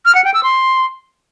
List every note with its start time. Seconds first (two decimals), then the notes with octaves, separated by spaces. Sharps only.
0.05 F6
0.15 F#5
0.24 G5
0.34 E6
0.43 C6